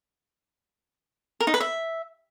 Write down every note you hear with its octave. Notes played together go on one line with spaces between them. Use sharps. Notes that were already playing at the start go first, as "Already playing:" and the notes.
A#4
D#4
B4
E5